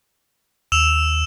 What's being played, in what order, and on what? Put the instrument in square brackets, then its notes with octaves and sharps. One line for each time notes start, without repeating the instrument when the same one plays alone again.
[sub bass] D#2 [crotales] E6 E7 F7